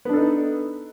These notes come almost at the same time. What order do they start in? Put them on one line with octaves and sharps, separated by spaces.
B3 D4 A4 D#4